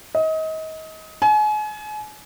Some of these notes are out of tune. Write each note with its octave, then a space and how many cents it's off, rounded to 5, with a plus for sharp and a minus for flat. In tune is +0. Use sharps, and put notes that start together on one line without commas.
D#5 +30
G#5 +35